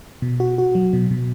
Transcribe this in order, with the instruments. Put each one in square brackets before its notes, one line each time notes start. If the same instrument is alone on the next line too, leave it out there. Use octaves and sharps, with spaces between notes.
[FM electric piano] B2
F#4
F#4
F#3
B2
B2